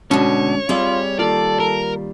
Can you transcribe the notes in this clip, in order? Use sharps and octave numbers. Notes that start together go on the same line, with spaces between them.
D2 B2 D3 G#3 C#4 C#5
G3 C4 F4 G#4 D#5
D#3 A#3 F4 A4 D5
A#4